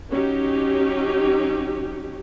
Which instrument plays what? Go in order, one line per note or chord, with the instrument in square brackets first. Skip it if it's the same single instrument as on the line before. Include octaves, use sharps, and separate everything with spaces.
[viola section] F#3 C#4 D#4 G4